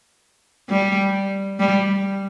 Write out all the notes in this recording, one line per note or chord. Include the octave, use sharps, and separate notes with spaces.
G3
G3